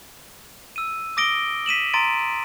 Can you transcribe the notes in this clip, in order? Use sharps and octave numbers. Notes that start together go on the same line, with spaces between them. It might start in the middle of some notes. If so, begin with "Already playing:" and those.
E6 D#7
D6 D#6 A#6 D7 G7
B6 D#7 E7 F#7
A#5 C6 A6 D7 D#7